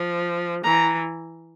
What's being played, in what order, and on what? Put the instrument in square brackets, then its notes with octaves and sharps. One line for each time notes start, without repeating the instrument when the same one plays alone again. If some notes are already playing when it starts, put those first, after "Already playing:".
Already playing: [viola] F3
[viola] E3 [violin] A#5